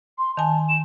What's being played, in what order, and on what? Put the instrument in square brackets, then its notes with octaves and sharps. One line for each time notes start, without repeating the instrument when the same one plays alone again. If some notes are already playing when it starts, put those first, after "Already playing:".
[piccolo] C6
[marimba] D#3 G#5 [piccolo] A5
[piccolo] E7